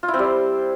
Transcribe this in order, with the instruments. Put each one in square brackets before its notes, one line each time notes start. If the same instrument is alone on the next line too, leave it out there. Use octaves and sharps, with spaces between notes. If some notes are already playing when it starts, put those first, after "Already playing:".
[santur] F4
E4
C4
G3
C5